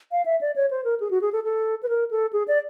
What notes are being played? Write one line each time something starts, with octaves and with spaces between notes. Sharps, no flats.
F5
E5
D5
C#5
C5
A#4
G#4
F#4
G#4
A4
A4
B4
A#4
A4
G#4
D5